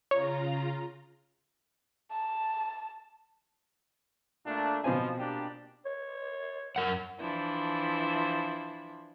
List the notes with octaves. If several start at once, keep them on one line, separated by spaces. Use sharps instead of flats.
C#3 F4 C#5 A#5
A5
A#2 A3 D4
B2 F3 C4 G#5
A#2 D4 G4
C#5
F#2 A#4 F#5
E3 F3 D4 E4